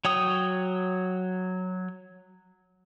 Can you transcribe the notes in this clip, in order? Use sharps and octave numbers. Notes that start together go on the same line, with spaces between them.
F#3 C#5 G5 D#6